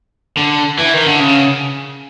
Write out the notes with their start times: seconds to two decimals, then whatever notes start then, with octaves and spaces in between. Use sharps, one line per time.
0.37 D3
0.79 E3
0.93 D#3
1.06 D3
1.19 C#3